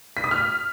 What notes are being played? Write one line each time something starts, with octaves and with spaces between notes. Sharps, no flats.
B6
D#6
F6